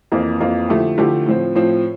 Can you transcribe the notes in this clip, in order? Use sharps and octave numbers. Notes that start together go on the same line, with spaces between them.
F2 E3 A#3 F4
F2 E3 A#3 F4
D3 F3 A3 E4 G4
D3 F3 A3 E4 G4
A2 F3 C4
A2 F3 C4